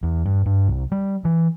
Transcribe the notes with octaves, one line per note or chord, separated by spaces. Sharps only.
E2
G2
G2
C2
G3
E3